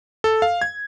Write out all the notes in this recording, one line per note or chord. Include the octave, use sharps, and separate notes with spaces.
A4
F5
G#6